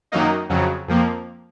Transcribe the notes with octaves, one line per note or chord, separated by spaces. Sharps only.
F#2 D#3 F#3 A#3 D#4
F2 C#3 F#3
F2 F3 A#3